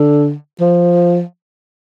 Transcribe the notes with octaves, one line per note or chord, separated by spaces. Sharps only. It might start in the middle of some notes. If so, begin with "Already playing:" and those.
Already playing: D3
F3